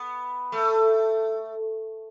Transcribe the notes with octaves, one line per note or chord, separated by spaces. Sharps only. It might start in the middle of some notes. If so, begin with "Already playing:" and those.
Already playing: B3
A3